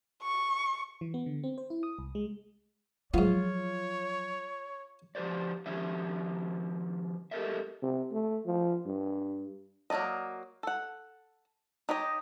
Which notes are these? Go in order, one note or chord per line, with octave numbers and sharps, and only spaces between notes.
C#6
E3
B3
D3
C4
C5
E4
D#6
C2
G#3
G#2 F3 F#3 B3 F4 C#5
F3 G4 B4 C5 D5
D#3 F3 C#4 G4 E5
G4 A4 A#4 D#5 E5
C3
A3
F3
G2
F#3 A#3 D#4 D5 D#5
A4 F#5
D#4 G4 C#5 D#5